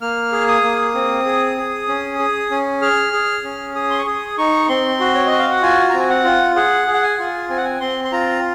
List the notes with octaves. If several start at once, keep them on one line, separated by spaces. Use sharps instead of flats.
A#3 F6
G#4
D#6
A#3
C4
G#4
G#4
C#4
G#4
C#4
G#4 F6
G#4
C#4
G#4 D#6
C6
C#6
G#4 D#6
D#4 C#6
C4 C6
F#4
C#5
D#5
F#4
F5
F#5
F4 G#5
C4 A#5
G#5
F#5
F4
G#4 F#5
G#4
F#5
G#5
F4
C4 G#5
F#5
G#5
C4 C6
C6
F4 A#5